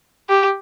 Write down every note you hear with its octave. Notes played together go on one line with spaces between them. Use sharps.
G4